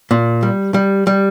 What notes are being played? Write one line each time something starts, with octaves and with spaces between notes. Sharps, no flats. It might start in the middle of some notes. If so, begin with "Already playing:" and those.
A#2
G3
G3
G3